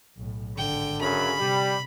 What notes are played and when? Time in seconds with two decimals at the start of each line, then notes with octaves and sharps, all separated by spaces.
0.17 B1 A2
0.58 G#1 D3 G5
1.01 F#2 C#3 B5
1.39 C3 G3